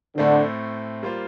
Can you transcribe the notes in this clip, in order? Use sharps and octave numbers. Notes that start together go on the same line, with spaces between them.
A2 D3 A3 C4
G3 A#3 F4 C5